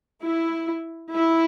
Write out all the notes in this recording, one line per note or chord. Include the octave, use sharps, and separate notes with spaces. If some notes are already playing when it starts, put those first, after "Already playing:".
E4
E4